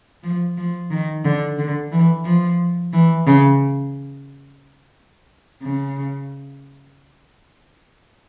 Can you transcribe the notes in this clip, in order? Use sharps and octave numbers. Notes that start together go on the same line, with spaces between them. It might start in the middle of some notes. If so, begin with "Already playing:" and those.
F3
F3
D#3
D3
D3
E3
F3
E3
C#3
C#3